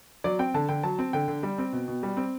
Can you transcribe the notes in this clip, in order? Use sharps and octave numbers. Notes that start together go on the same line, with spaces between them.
F#3 D5
C4 G5
D3 A5
D3 G5
F#3 A5
C4
D3 G5
D3
G3
C4
B2
B2
G3
C4